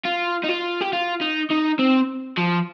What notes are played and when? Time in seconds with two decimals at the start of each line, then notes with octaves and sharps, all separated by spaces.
0.05 F4
0.44 D#4
0.49 F4
0.81 G4
0.93 F4
1.21 D#4
1.50 D#4
1.79 C4
2.38 F3